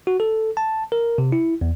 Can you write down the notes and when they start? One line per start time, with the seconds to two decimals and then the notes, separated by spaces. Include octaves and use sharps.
0.07 F#4
0.20 A4
0.57 A5
0.92 A#4
1.18 C3
1.32 E4
1.61 E2